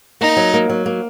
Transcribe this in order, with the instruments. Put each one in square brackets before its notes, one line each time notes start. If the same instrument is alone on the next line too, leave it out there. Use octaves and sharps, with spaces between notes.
[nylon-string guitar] A#3 [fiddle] D#4
[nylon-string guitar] F#3
A#3
F#3
A#3